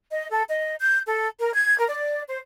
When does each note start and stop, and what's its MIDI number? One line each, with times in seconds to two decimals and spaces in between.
0.12 0.27 75
0.30 0.42 69
0.48 0.74 75
0.80 0.99 91
1.05 1.28 69
1.40 1.54 70
1.54 1.76 92
1.77 1.86 70
1.89 2.20 74
2.28 2.38 72